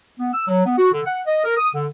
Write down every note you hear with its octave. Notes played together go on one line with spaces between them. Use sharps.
B3
E6
F#3
B3
F#4
D3
F#5
D#5
A#4
D#6
D3